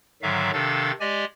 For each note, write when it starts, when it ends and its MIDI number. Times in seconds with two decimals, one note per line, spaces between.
0.22 0.51 44
0.22 0.51 50
0.22 0.51 51
0.22 0.51 54
0.22 0.51 76
0.22 0.51 77
0.53 0.92 48
0.53 0.92 51
0.53 0.92 62
0.53 0.92 69
0.53 0.92 77
0.53 0.92 93
1.00 1.25 56
1.00 1.25 67
1.00 1.25 74
1.00 1.25 75
1.00 1.25 80